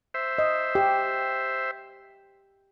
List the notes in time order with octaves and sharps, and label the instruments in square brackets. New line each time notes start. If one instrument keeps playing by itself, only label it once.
[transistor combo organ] C5 E5
[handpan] D#5
G4